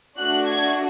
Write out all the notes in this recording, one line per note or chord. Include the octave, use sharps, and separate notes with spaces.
A3 D4 F#4 F#6
G#6